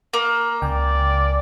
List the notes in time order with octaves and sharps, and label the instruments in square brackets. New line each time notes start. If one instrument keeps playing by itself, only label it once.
[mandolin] A#3
[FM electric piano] C#2 G5 G#5 [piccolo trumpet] D5